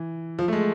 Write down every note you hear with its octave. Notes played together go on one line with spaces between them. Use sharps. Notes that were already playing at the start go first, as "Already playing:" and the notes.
Already playing: E3
F3
A3
G#3